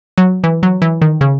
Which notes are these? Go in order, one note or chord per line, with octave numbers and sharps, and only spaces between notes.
F#3
E3
F#3
E3
D#3
C#3